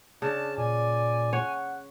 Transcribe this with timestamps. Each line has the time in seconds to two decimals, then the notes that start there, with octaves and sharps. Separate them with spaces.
0.22 C#3 D4 A5
0.58 A#2 D5 G#5
1.33 C#5 F#5